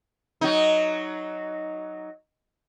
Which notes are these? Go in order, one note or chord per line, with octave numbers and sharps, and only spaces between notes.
F#3 D#4